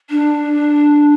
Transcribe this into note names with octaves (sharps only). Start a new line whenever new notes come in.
D4